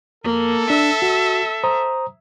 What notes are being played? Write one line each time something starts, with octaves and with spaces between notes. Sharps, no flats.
F2 A#3 A4
D4 E5
F#4
C5 A#5 D#6